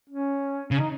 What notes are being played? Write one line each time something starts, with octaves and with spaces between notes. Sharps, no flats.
C#4
C#3 C#4
D#4